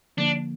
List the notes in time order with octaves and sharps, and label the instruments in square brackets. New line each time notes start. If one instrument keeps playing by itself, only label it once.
[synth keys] D3 F3 A#3 [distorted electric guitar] D4